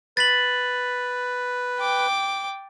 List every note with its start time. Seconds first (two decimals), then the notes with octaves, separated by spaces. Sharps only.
0.17 B4 A6 B6 F#7
1.79 G5 D6